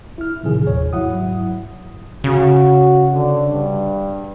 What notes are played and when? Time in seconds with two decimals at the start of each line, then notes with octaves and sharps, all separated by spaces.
0.18 E4 F6
0.43 A2 C3 D#3 F3 G#4
0.65 G1 D#2 C#5
0.93 G#2 F#3 E4 F#5 D#6
2.24 C#3 F#4
3.14 D3
3.49 G2